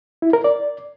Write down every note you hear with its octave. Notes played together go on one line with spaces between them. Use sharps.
E4
A#4
D5